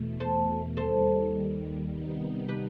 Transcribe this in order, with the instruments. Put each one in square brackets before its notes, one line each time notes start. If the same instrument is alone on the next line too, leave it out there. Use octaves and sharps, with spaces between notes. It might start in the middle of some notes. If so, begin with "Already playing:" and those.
Already playing: [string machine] E2 B2 A3
[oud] A4 C5
[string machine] D#2 D#3 G3 [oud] A4 C5
[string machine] C3 D#3 G3 B3 D#4
[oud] G4 B4